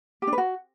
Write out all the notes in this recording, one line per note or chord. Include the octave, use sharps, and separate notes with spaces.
G4
D4
B4
F#4